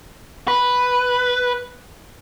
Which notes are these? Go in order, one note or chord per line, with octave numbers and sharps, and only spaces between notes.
B4